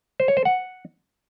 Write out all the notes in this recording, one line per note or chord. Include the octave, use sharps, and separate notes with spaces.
C5
C#5
C5
F#5